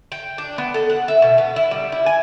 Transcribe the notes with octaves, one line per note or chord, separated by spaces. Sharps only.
G5
D4
B3
A4
F#5
E5
B2
B3
E4
G3
E4
G#5